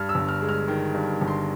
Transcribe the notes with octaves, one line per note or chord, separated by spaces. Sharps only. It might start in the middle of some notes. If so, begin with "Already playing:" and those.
Already playing: G2 F6
E6
G1
F6
G#3
F6
D#3
G2
G1
C6